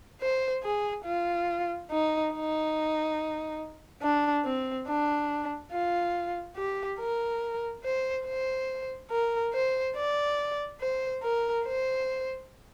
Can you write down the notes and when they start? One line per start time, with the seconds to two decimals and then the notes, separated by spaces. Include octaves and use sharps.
0.21 C5
0.64 G#4
1.05 F4
1.91 D#4
2.34 D#4
4.02 D4
4.45 C4
4.87 D4
5.72 F4
6.56 G4
7.00 A#4
7.84 C5
8.26 C5
9.11 A#4
9.53 C5
9.96 D5
10.81 C5
11.23 A#4
11.66 C5